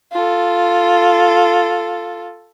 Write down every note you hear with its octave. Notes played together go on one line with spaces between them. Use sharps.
F4 A4